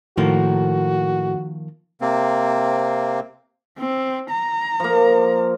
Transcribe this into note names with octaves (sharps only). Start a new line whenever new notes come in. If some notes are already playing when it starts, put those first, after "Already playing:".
A2 D#3 F3 A#3 F#4
C3 A#3 C4
C4
A#5
F3 A#3